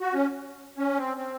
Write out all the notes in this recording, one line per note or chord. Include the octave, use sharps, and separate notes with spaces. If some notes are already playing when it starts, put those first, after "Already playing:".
F#4
C#4
C#4
C4
C4